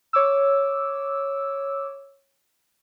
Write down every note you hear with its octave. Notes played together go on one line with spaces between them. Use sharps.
C#5 D6 E6